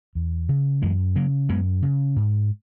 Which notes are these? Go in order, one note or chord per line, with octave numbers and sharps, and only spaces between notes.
E2
C#3
F#2 E3 G#3
C#3 F#3 A#3
F#2 G#3 B3
C#3
G#2